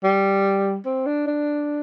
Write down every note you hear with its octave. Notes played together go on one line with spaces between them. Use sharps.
G3
C4
D4
D4